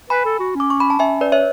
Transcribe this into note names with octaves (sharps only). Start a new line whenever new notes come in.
B4 G#5 B5
A4
F#4
C#4 D6
C#6
B5
A5
C#4 E5 G#5
B4 D5
C#5 E5